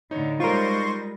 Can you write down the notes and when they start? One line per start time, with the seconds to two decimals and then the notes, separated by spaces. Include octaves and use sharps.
0.11 A2 D3 D#4 C#5
0.40 G3 G#3 F4 A#4 C5 C6 C#6